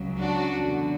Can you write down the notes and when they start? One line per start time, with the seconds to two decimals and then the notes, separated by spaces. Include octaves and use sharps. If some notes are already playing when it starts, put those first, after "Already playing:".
Already playing: C#2 C#3 F#3
0.16 D4 F#4
0.56 E2 D3 F#3